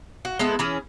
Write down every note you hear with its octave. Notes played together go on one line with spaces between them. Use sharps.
F#4
G#3 B3 E4 A4
E3 C#4 G#4